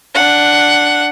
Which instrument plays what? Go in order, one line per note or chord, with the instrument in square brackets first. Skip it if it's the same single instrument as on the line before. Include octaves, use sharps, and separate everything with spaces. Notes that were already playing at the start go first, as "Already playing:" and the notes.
[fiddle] D4 F#5